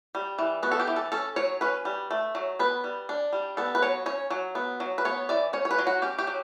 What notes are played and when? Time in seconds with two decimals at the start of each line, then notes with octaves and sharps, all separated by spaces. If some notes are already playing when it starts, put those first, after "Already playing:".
0.15 G3
0.39 E3
0.63 B3 F#4
0.72 A4
0.79 G4
0.87 E3
0.96 A4
1.12 C#4 A4
1.36 F#3 C#5
1.61 C#4 B4
1.85 G3
2.11 A3
2.35 F#3
2.59 B3 B4
2.84 G3
3.09 D4
3.33 G3
3.57 B3 A4
3.75 B4
3.82 F#3 C#5
4.06 C#4 C#5
4.30 F#3
4.55 B3
4.80 F#3
4.98 B4
5.05 B3 C#5
5.29 E3 D5
5.53 C#4 C#5
5.65 C#5
5.71 B4
5.79 F#3
5.87 F#4
6.02 C#4 G4
6.18 G4
6.27 F#3